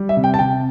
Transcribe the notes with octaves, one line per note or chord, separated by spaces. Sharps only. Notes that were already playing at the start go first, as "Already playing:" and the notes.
Already playing: G3
E5
C3
G5
A5
C3 G5